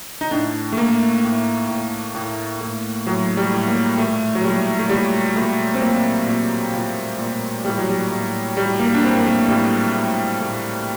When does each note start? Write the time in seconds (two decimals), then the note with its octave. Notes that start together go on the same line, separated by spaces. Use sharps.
0.21 D#4
0.31 A2 D4
0.72 A3
0.77 A2 A#3
1.23 A2
1.69 A2
2.15 A2
2.61 A2
3.06 A2 F#3
3.37 G3
3.52 A2
3.67 A#3
3.98 A#2 A3
4.35 F#3
4.44 A#2 G3
4.79 A3
4.89 A#2 G3
5.36 A#2 A3
5.74 C4
5.81 A#2 A#3
6.27 A#2
6.73 A#2
7.19 A#2
7.65 A2 G3
7.78 F#3
7.90 G3
8.11 A2
8.57 A2 G3
8.79 A#3
8.94 D4
9.03 A2 C4
9.15 A#3
9.26 A3
9.48 A2 G3
9.94 A2
10.41 A2